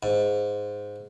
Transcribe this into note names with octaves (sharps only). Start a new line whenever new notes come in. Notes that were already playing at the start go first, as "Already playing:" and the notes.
G#2